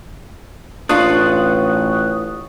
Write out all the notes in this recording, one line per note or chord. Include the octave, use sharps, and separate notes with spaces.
A1 D4 F4 C#6 D#6 F#6